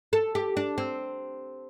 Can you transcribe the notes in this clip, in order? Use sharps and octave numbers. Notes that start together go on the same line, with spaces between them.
A4
G4
D4
C4